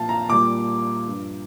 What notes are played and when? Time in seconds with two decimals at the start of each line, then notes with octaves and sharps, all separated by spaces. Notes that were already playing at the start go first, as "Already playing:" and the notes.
Already playing: A#2 F3 F5 A5
0.09 A#5
0.29 A#2 G3 D6
1.06 G2 F3